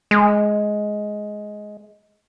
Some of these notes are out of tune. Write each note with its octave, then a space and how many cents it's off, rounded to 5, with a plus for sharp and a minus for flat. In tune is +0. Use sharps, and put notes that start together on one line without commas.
G#3 +10